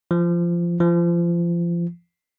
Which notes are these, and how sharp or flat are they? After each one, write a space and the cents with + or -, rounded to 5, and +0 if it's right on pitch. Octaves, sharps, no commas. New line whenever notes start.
F3 -20
F3 -30